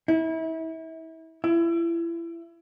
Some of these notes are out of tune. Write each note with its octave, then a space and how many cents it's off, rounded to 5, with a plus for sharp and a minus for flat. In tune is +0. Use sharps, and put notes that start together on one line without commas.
E4 -30
E4 +30